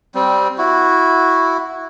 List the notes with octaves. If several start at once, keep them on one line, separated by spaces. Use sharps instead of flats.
G3 C4
E4 F#4